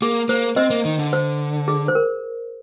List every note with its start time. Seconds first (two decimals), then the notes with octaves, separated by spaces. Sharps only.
0.02 A#3 G#4
0.29 A#3 C5
0.56 C4 C5 D#5
0.70 A#3
0.85 D#3
0.99 D3
1.13 C5
1.68 G#4
1.88 C5
1.95 A#4